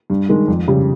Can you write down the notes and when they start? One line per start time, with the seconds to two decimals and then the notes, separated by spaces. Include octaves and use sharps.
0.10 G2
0.29 D#3 G#3
0.48 F2
0.68 C#3 G3